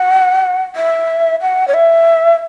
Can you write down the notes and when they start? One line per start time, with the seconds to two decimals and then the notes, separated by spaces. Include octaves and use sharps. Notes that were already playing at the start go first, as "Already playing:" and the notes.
Already playing: F#5
0.76 E5
1.42 F#5
1.68 C#5
1.74 E5